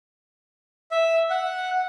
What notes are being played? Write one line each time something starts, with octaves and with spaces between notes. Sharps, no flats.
E5
F#5